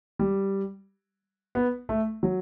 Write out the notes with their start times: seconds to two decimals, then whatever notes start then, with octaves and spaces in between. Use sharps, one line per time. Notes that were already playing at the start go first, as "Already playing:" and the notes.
0.19 G3
1.55 B3
1.89 A3
2.23 F#3